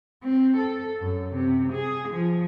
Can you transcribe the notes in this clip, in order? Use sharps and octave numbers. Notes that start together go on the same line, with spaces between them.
C4
A4
F#2
C3
G#4
F3